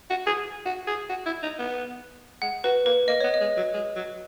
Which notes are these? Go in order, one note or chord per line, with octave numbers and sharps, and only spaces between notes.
F#4
G#4
F#4
G#4
F#4
E4
D#4
B3
G#3 F#5
F#4 B4
A#3 B4
A#3 D#5
B3 C#5
D#5
G#3
F#3
G#3
F#3